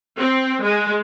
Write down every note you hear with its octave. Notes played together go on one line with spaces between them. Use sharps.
C4
G#3